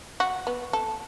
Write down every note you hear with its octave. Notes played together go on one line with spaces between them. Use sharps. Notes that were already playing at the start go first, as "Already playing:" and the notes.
F#4
B3
A4